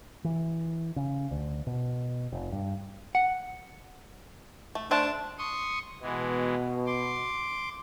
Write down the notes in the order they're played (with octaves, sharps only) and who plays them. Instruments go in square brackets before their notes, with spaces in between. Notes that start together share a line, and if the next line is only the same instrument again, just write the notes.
[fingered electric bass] E3
C#3
D2
B2
F1
G2
[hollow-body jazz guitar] F#5
[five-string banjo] A3
[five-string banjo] A3 C5 A5 [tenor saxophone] D4
[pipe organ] C6 C#6 D#6
[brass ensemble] B2 [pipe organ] E3 G#3
[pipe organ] C6 D6